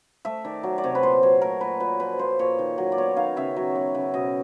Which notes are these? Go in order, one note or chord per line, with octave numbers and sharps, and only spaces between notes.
A3 E5
D#3 D5
F#3
D5
C3 C#5
B4
A#2 C5
F#3 C#5
A3 A#4
A#2 B4
A#2 B4
F3 B4
A#3 C5
A#2 C#5
D#3
F#3
D5
B3 C#5
D#3 F5
C#3 E5
F#3
B3
C#3
B2 D#5